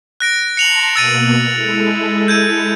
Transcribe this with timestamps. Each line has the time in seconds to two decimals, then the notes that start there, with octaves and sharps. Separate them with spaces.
0.20 F#6 A#6 D7
0.57 A5 A#5 C6 C#7 F7 F#7
0.96 B2 A#3 E6 A6 D#7
1.54 G#3 E4 A4
2.28 G6 G#6 D#7